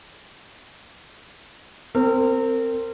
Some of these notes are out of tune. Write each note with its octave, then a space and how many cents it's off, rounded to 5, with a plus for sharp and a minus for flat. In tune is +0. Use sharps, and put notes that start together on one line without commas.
C4 -5 A#4 -35